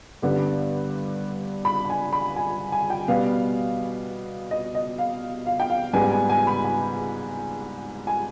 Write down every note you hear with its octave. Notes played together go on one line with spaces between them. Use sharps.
G2 D3 G3 B3
B5
B5
G#5
B5
G#5
G#5
G5
B2 G3 B3 F5
D#5
D#5
F5
F5
G5
F5
G#2 G3 B3 G#5
G#5
G#5
B5
G#5
G#5